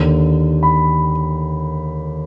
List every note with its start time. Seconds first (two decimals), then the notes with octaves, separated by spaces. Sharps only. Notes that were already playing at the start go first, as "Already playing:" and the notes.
Already playing: D#2 D3
0.63 B5